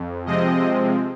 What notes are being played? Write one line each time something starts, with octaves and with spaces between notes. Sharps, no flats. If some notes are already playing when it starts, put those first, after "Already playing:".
Already playing: F2
C3 F3 G#3 C4 D#5